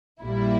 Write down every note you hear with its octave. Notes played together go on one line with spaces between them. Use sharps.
A#1 A#2 G3 A#3 E4